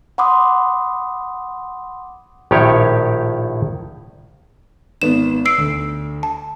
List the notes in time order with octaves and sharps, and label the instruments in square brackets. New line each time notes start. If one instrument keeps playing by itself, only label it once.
[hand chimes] F#5 B5 C6 D6 D#6
[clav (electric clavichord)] A#1 A2 D#3 G4 C#5
[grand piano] G#1 B3 [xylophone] E7
[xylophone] E6 C7 D7
[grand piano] D2
[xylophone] A5